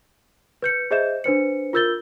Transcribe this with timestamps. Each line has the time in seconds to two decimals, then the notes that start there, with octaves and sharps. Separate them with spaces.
0.62 B4 G6 C#7
0.91 G#4 C5 D#5 E5 G6 E7
1.24 D4 B4 C5 C#7
1.73 F4 A#4 E6 G6 A6 G7